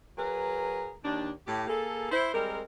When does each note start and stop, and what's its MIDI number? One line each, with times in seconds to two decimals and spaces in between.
0.17 0.91 54
0.17 0.91 68
0.17 0.91 70
0.17 0.91 71
1.03 1.30 39
1.03 1.30 62
1.47 1.63 45
1.47 1.63 67
1.67 2.08 58
1.67 2.08 68
1.67 2.08 69
2.11 2.33 64
2.11 2.33 72
2.33 2.60 55
2.33 2.60 56
2.33 2.60 60
2.33 2.60 70